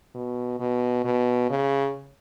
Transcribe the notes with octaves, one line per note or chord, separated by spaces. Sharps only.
B2
B2
B2
C#3